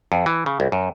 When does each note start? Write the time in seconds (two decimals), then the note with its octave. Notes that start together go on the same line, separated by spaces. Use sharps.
0.12 F2
0.26 E3
0.46 C#3
0.60 C2
0.72 F#2